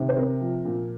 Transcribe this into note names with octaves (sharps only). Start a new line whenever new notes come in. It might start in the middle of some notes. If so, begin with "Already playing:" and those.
Already playing: C3 D#3
C5
C4 A#4
F3
A#2